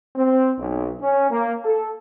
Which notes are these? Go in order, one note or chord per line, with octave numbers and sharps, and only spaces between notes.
C4
B1
C#4
A#3
A4